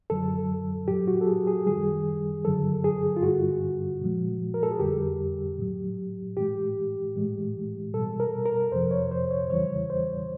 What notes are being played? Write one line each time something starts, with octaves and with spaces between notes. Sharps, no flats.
F#2 D3 F#3 A4
A2 F#3 G4
F#4
A4
G#4
G#4
F#2 D#3 G3 G#4
G2 D3 F#3 A4
G#4
F4
G2 D3 G3 F#4
A#2 F3 G#3
A#4
A4
G#4
F2 D3 G3 G4
A2 F#3
A2 E3 G#3 G4
A2 E3 G#3
B2 G3 A4
A#4
A#4
F2 C3 F3 C5
C#5
C5
C#5
E2 C#3 E3 G3 C#5
C5